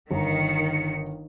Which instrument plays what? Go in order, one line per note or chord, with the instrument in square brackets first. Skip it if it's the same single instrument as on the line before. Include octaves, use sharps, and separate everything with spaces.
[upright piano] G1 A#5 [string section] D#3 C#7